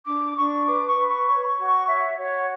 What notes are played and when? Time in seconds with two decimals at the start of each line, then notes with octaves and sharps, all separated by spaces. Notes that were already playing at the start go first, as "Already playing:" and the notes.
0.06 D4 D6
0.36 D4 C#6
0.66 B4 D6
0.86 C#6
0.96 B4
1.07 C#6
1.27 C#5 C#6
1.43 B5
1.47 C#6
1.57 F#4
1.67 C#6
1.87 C#5 E5
2.17 F#4 C#5